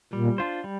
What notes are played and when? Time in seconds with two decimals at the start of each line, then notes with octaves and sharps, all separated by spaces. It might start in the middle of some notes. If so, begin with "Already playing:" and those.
0.13 A#2 G3
0.38 D4 F4 C5
0.64 G3